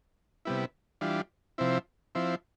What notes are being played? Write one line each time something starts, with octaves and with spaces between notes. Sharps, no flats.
C3 G3 B3 E4
E3 G3 D4 F4
C3 F3 C4 E4
F3 C4 E4